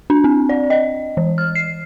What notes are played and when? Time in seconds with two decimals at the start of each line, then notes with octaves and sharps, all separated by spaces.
0.10 D4
0.24 C4
0.49 D5
0.70 D#5
1.17 E3
1.38 F6
1.55 C7